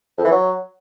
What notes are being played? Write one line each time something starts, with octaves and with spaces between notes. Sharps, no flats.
F2
E3
F#3